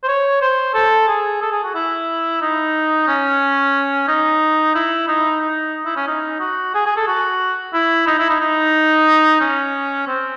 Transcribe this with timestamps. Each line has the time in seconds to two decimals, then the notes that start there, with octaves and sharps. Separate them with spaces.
0.03 C5
0.08 C#5
0.42 C5
0.74 A4
1.08 G#4
1.42 A4
1.52 G#4
1.64 F#4
1.75 E4
2.42 D#4
3.08 C#4
4.08 D#4
4.75 E4
5.08 D#4
5.41 D#4
5.86 E4
5.97 C#4
6.08 D#4
6.40 F#4
6.75 G#4
6.86 G#4
6.97 A4
7.08 F#4
7.74 E4
8.07 D#4
8.19 E4
8.30 D#4
8.40 D#4
9.41 C#4
10.07 C4